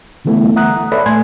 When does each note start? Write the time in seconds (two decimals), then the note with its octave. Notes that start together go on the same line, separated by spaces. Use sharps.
0.25 D3 E3 G3 A3 B3 E4
0.56 E5 F#5 A#5 D#6 F#6
0.92 A4 B4 C#5 D5 E5 B5
1.06 A2 A3 G#5 C6 G#6